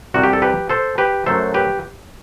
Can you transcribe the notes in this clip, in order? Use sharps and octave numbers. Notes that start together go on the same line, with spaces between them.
C2 C3 G3 F#4
G4
A4
G4 B4
A4 C5
G4 B4
F#2 F#3 A3 A4 C5
G4 B4